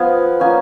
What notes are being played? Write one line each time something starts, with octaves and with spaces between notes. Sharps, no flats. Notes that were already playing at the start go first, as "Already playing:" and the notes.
Already playing: F3 B3 F4 G#5
F3 A#3 C#4 G#5